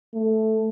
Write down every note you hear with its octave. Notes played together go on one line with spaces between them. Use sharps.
A3